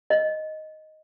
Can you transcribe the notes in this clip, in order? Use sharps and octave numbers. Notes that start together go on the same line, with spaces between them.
D#5